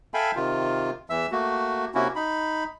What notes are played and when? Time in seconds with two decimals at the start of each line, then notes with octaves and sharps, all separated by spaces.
0.14 A4 E5 F5 G5 G#5 B5
0.36 C3 D#3 F4
1.10 E2 E3 E5 E6
1.32 A3 A#3 F#4
1.95 C3 A#3 C#4 E4 F#4
2.16 D#4 B5